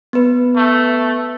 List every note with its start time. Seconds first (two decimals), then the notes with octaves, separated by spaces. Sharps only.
0.13 B3 B4
0.56 A3